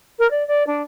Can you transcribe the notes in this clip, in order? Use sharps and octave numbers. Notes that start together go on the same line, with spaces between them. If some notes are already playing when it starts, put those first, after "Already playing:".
A#4
D5
D5
D4